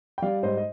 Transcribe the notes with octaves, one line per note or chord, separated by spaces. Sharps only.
G5
G3 D5 F5
G#2 C5 D#5
D#5